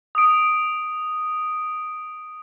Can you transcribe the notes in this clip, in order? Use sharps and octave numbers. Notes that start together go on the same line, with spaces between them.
D#6 D7